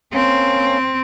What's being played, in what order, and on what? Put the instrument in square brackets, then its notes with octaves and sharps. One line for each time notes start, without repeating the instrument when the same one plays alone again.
[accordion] A#3 C#4 [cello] C4